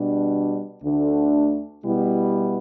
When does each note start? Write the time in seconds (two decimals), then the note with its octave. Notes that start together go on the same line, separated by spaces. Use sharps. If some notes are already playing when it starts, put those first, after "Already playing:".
Already playing: B2 G3 D4
0.83 D2 D3 A3 D4
1.84 B2 G3 B3 E4